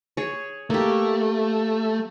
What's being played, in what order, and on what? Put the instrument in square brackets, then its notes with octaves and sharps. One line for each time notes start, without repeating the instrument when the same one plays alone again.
[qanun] G#4 C#5
[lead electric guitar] A3 [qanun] A#3 G4